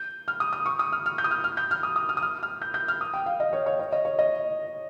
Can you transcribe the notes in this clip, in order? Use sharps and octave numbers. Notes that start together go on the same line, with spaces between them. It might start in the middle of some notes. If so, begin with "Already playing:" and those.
Already playing: G6
F6
D#6
D#6
C#6
D#6
F6
F6
G6
D#6
F6
F6
G6
F6
D#6
D#6
F6
D#6
F6
F6
G6
G6
F6
D#6
G5
F5
D#5
C#5
C#5
C#5
D#5
C#5
D#5